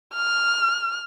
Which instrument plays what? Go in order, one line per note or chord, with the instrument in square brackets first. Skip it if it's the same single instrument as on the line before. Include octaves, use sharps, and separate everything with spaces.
[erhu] F6